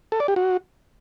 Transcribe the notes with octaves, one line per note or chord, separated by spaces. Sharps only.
A4
D5
G4
F#4